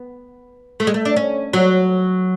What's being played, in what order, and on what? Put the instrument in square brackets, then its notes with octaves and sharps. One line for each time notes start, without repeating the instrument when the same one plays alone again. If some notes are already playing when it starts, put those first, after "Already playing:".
Already playing: [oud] B3
A3
G#3
A3
D4
C#4
F#3